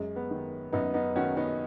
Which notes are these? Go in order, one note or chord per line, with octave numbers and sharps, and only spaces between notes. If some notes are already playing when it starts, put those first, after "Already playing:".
Already playing: F#2 G#3
B3
D#3
F#2 B3 D#4
B3 D#4
D#3 C#4 F#4
B3 D#4